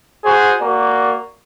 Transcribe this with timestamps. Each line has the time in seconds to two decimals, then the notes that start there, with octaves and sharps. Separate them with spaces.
0.24 F#4 G#4 C5
0.60 A#3 F#4 D5